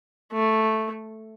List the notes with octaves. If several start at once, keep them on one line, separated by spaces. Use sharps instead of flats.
A3